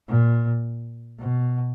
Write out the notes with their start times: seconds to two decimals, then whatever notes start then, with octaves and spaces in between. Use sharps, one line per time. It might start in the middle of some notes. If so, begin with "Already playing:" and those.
0.09 A#2
1.19 B2